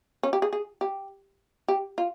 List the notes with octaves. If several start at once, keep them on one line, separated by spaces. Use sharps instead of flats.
C#4
G4
G#4
G#4
G4
G4
F4